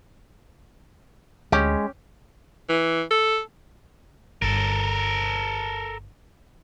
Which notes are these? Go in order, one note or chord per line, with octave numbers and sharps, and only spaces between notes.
D2 G#3 C#4 G4
E3
A4
G1 A4 A#4